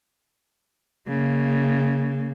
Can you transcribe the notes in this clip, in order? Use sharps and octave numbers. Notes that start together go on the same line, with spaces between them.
C#3 A#3